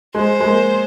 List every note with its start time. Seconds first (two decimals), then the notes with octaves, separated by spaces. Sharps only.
0.15 G#3 C5
0.40 G#3
0.46 A#3